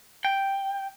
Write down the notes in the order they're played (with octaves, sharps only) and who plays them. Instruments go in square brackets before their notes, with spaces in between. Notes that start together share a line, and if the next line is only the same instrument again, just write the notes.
[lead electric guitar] G5